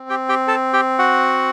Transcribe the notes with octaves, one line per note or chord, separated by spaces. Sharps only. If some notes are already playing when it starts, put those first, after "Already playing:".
Already playing: C4
G4 G5
G4 G5
A4 A5
G4 G5
F#4 F#5